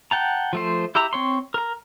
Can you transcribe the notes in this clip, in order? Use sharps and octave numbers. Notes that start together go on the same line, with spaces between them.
F#5 G5 A5 A#5
F3 A3 C5
E4 G4 E5 A#5
C4 C#5 C6
A#4 A#5